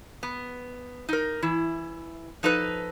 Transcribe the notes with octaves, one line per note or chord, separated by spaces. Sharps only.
B3
D#4 A#4
E3 E4
F3 D#4 A4 B4